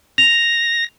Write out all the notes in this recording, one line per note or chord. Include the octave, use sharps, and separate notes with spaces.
A#6 F7